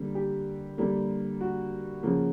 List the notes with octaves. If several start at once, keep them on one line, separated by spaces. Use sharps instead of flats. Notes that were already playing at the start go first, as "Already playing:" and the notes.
Already playing: D3 G3 A#3
G4
D3 G3 A#3
F#4
C#3 F3 A#3